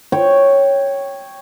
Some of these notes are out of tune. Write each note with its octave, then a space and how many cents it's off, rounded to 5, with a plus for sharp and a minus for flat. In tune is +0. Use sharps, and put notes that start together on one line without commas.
C#5 -5 G5 +0